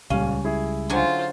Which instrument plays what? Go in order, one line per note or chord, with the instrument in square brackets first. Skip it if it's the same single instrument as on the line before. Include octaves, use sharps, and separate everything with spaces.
[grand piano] D#1 F5 D#7 [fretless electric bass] C#2 G3 [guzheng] C#4
[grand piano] E4 G#4
[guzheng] D3 F#3 G#5 [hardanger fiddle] F4 C5